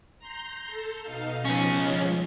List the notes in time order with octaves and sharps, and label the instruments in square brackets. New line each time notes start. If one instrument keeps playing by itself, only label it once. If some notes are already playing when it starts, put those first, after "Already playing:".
[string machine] A#5 C6 G6
A4
B2 D#4 F5
[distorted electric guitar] C#2 C#4 [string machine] F3